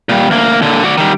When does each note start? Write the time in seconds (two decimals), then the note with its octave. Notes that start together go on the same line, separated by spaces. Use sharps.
0.09 A#2 G3
0.30 D2 A#3
0.62 A#2 D3
0.84 F#4 D5
0.97 D#3 G3